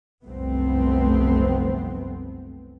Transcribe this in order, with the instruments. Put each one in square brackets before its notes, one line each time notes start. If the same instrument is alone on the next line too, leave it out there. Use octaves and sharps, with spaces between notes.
[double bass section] F1 C2 F#2 A3 B3 C4